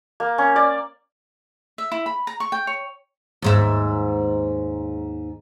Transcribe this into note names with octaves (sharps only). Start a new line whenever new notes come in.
A#3
C#4
D5
E5
E4
B5
A#5
C#6
G5
C#5
D#2 G#2 E5